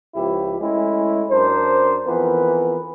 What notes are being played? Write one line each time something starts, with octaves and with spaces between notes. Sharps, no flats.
C#2 F3 E4 G4
G#3 A3 C#4 E4
F#2 D4 A#4 C5
F2 E3 B3 A#4 B4